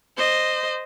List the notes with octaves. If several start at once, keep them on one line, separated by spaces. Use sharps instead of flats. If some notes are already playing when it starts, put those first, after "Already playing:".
C5 D#5